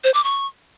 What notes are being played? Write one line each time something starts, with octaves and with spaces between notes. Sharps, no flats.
C5
D6
C#6